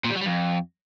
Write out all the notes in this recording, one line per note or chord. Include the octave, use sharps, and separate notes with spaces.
A#2
G3
F#3
G3
F2